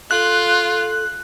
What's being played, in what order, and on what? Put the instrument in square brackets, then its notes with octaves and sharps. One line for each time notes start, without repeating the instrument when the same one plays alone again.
[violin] F4 [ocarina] A4 [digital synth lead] F#6